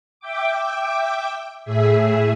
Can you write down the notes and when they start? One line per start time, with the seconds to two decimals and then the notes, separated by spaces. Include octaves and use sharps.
0.20 E5 G5 D6
1.65 A2 G#4 E5